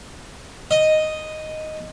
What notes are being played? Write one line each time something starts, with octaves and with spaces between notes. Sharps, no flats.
D#5